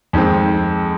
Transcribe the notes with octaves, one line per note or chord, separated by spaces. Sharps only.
F2 D#3 G#3 C4